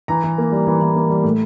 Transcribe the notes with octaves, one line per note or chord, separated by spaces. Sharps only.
E3 A#5
E3
A#3
G3
E3
E3
A#3
G3
A2